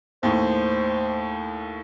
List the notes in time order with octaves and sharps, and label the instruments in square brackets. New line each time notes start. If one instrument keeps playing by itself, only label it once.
[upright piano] D#2 A2 [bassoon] C5